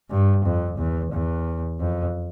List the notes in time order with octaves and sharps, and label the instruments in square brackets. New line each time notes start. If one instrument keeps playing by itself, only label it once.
[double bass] G2
F2
E2
E2
F2